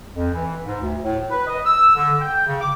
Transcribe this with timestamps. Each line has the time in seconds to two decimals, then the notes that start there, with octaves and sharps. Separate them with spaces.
0.15 F2
0.33 E3
0.66 G#2
0.81 D2
1.03 A2
1.30 B4
1.47 D#5
1.66 E6
1.95 D3
2.21 G5
2.46 C#3
2.60 D6